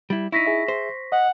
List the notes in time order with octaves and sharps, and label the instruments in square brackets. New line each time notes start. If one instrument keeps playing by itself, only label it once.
[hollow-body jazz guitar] G3 E4
[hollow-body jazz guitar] D#4 E4 [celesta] C#6 A#6 B6
[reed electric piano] G#4 E5
[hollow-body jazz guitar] C5
[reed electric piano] D#5 [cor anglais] F#5